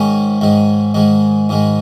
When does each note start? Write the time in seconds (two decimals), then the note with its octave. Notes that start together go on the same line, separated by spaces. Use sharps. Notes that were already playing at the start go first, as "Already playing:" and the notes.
Already playing: G#2 D#3 G#3 C#4
0.41 G#2 D#3 G#3
0.94 G#2 D#3 G#3
1.49 G#2 D#3 G#3